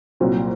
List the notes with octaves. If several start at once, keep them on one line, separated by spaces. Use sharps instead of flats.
C2 A#2 F#3 C4